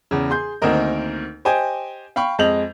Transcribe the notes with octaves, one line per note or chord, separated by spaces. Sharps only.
E2 C#3
G#4 C6 G6
D2 D#3 A#3 C4 A#4 D#5
G4 C5 D#5 G5 G#5
F5 G5 B5 C#6
F2 G#3 D#5 G6 F7 F#7